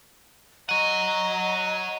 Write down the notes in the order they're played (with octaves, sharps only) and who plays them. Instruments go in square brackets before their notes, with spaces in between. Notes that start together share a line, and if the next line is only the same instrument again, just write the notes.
[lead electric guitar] C#5 F#5 [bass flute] D#5 [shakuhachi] A#5 [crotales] D#7